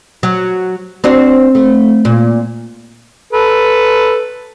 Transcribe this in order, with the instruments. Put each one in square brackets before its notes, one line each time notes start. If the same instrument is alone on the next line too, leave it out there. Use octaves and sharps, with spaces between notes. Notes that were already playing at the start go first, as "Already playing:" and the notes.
[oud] F#3
C4 D4 F#4
A3
A#2
[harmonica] A4 B4